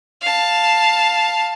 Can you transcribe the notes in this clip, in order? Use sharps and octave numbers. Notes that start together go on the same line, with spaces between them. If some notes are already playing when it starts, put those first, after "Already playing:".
F5 A5